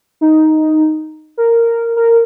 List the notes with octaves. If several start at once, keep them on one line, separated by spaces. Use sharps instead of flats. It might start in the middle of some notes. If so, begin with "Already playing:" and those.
D#4
A#4
A#4